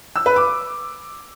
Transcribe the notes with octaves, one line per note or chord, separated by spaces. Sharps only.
E6
B4
D6